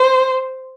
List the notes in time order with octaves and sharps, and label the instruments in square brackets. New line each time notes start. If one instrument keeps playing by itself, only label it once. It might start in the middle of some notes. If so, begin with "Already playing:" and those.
Already playing: [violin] C5